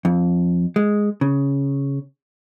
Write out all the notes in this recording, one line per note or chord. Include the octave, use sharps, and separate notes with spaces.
F2
G#3
C#3